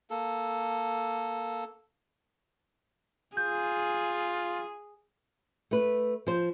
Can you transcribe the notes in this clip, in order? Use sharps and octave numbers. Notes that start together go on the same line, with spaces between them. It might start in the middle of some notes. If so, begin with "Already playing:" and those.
A#3 A4
F4 G#4 G6
A3 B4
F3 C5